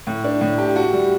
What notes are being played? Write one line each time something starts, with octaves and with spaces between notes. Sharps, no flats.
A2
D4
A2
G4
F#4
G3